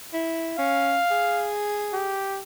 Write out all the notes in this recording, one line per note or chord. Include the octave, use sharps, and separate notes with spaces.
E4
C#4 F5
G#4
G4